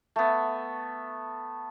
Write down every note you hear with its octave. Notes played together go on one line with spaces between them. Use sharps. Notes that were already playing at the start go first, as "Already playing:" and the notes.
A3 B3